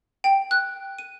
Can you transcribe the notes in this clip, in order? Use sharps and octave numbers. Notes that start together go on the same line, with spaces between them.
G5
F#6
D#7